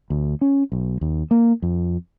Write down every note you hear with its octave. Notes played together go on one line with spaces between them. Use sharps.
D2
C#4
B1
D#2
A#3
F2